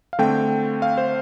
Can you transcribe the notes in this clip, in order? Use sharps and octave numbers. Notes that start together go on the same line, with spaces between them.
F5
D3 A3 C4 G5
F5
C5